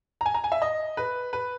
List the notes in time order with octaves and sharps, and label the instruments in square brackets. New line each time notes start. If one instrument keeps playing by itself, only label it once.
[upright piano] A#5
G#5
A#5
G#5
E5
D#5
B4
B4